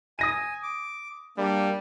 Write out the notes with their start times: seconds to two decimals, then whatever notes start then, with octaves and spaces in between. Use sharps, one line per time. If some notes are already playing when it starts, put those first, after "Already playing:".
0.19 G#5 D#6 A#6 D#7
0.63 D6
1.38 G3 A#3 D4